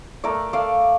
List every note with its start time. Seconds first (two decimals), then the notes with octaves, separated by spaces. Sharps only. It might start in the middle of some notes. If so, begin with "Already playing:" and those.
0.24 A3 A#4 D5
0.53 A3 D5 F5